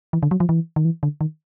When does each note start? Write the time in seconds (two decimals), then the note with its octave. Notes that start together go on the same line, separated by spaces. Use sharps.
0.13 E3
0.23 D3
0.31 F#3
0.40 F3
0.49 E3
0.76 D#3
0.85 E3
1.03 D3
1.21 D#3